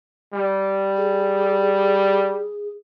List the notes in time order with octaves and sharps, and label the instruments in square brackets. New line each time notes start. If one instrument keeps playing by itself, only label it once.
[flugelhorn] G3
[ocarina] G#4